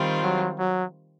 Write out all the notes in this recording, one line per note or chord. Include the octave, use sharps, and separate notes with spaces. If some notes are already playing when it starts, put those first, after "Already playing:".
Already playing: D#3 G3 C4 F4
F#3
F#3